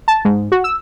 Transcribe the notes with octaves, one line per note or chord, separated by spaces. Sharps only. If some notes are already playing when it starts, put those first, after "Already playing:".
A5
G#2
F#4
E6